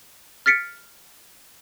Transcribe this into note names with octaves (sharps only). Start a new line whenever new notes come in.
F6 A6 B6 C#7 D7